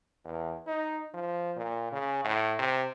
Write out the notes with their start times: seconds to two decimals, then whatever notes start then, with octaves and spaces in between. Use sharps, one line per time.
0.25 E2
0.67 D#4
1.14 F3
1.56 A#2
1.92 C#3
2.24 A2
2.59 C3